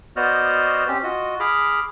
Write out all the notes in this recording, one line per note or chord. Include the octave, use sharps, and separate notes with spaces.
B3 F#4 C5 D5 D#5 F6
C4 C#4 G4
F4 F#4 D#5
G#4 B5 D6 F6